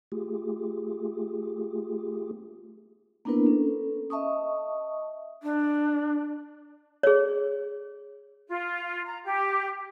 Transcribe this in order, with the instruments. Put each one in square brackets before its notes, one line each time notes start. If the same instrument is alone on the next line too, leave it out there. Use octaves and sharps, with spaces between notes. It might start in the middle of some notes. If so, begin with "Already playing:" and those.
[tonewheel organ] A3 F4 G4 G#4
[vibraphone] A#3 B3 D4 E4 A#4 B4
C#4 A4
D#5 E5 A5 C#6 D#6
[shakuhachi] D4
[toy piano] G#4 C#5
[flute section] F4
A#5
G4